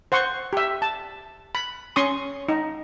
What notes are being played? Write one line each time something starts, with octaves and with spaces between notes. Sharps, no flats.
C5 F#5 C6 C#6
G4 E5
A5
B5
C#4 C6 C#6 D#6
D#4